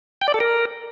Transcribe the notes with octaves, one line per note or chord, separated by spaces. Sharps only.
G5
D5
A4
A#4